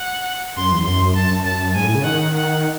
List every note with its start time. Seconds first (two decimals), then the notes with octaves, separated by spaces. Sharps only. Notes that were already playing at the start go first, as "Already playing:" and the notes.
Already playing: F#5
0.57 F#2 C6
0.72 E2
0.86 F#2 C6
1.16 F#2 A5
1.31 F#2
1.45 F#2 A5
1.75 G#2 G#5
1.84 A2
1.95 C#3
2.05 D#3 F#5
2.34 F#5